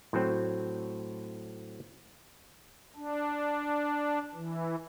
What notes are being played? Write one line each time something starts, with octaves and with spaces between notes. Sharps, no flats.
A2 F#3 C4
D4
E3